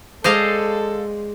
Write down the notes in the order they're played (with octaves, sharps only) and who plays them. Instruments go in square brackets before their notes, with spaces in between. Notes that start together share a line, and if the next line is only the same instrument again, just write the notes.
[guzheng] G#3 D5 [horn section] A4 [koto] C5 D#5 F5